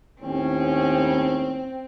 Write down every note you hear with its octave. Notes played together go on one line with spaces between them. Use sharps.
D#2 A2 C4 C#4